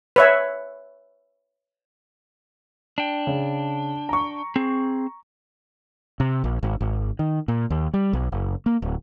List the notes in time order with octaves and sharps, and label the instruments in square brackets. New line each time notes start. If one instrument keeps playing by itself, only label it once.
[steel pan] B4 C#5 E5
[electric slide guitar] D4 G5
[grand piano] C#3
A#5 C#6
[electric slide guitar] C4 G#4
[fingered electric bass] C3
A#1
G#1
G#1
D#3
A#2
D#2
G3
B1
F#1
A#3
D1